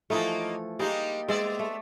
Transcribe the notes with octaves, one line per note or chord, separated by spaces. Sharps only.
E3 F3 A3 A#3 D#4 F4
G3 G#3 A#3 D#4 G4
G#3 B3 D5 E5
A3